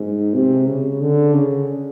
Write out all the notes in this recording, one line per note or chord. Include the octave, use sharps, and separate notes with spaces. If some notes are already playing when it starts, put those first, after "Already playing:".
Already playing: G#2
C3
C#3
D3
C#3